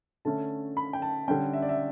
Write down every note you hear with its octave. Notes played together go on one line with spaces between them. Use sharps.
D3 A3 C#4 A5
B5
G5
A5
D3 G3 C#4 G5
E5
D5
E5